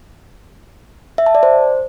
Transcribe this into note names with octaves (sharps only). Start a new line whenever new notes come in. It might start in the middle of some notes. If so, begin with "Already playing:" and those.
E5
A5
D5
C5